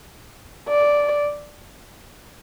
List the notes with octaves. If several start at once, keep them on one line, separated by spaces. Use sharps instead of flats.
D5